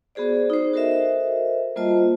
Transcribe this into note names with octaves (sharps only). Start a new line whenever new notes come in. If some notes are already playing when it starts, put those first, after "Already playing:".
B3 F#4 G#4 C5 D5
D#4 C5
F#4 A4 A#4 C5 D#5 E5
G3 A#3 F4 C5 D#5 A5